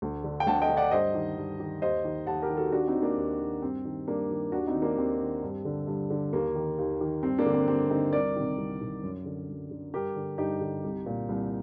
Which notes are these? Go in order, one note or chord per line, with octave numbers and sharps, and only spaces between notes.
D2
D3
G5
D2 F#5 A5
D#5 G5
D3
D5 F#5
G2 C5 D#5
D#3
G2
D#3
D#2 C5 D#5
D#3
D#2 F#5 A5
G4 A#4
D#3
F#4 A4
D#2 D4 F#4
C4 D#4
D#3
A#3 D4
D#2
D#3
G2 C4
D#3
G2 A#3 D4
D#3
D#2 D4 F#4
C4 D#4
D#3
A#3 D4
D#2 C4
D#3
G2
D3
G2
D3
D#2 A#3
D#3
D#2
D#3
G2 C4
A#3 D4
D3
C4
G2 C4
D3 C4 D#4
C2 A#4 D5
C3 D#3
C2
C3 D#3
F#2
D3
F#2
D3
G2 G4 A#4
D3
G2 D#4 G4
D3
C2
A#2
C2